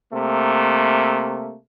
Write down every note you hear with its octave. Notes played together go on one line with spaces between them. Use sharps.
C3 A3 A#3